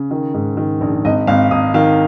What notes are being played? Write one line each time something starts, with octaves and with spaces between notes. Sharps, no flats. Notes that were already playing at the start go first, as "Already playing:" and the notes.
Already playing: C#3
D#3
G#2
D#3
A#1
G#1 D#5
G#1 F5
G#1 D#6
D#3 F5